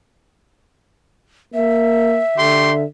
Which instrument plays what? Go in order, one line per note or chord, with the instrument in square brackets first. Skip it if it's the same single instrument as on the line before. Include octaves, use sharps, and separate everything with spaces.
[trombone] A#3 [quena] E5
[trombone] D3 [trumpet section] A3 G4 C6